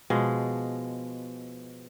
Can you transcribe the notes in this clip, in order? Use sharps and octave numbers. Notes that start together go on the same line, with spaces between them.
B2 F3 G#3